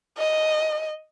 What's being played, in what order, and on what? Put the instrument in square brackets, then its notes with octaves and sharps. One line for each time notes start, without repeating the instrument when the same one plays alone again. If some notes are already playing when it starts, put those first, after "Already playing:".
[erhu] D#5